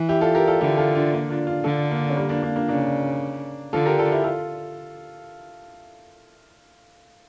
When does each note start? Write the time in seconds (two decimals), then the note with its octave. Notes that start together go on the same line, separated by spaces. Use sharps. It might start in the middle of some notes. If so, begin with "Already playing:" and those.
Already playing: E3
0.09 E4 G4
0.21 F4 A4
0.35 G4 A#4
0.47 F4 A4
0.61 D3 E4 G4
0.77 F4 A4
0.95 D4 F4
1.12 A#3 D4
1.29 D4 F4
1.47 D4 F4
1.64 D3 F4 A4
1.90 A#3 D4
2.10 C#4
2.16 G3 A#3
2.29 A#3 D4
2.42 A#3 D4
2.56 A#3 D4
2.68 C#3 A#3 D4
3.73 D3 F4 A4
3.86 G4 A#4
3.99 F4 A4
4.12 E4 G4
4.24 F4 A4